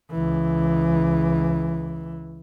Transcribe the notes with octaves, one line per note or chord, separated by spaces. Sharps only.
C#2 E3